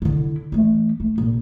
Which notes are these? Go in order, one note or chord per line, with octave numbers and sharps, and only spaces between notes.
D3 E4
E3 A3
A3
A#1